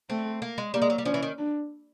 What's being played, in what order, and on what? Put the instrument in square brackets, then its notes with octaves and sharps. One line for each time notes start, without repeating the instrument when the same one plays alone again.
[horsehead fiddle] A3 [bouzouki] C4
[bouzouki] A#3
G#3
[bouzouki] G3 [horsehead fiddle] A#3
[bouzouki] G#3
F#3
G3
[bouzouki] F3 [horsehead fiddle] C#4
[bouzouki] E3
D#3
[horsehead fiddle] D4